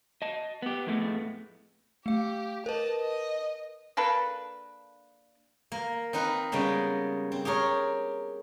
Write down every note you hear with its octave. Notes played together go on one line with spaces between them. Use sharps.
D#5 A5
B3 G4
F2 A2 G#3 A3 B3
A3 G4 F5
A#4 B4 D#5 A5
D#5
A#3 D4 A4 B4
A#3
C4 D#4 A#4 B4 F#5
C#3 G3 G#3 A#3 B3
C4
G4 G#4 A#4 C#5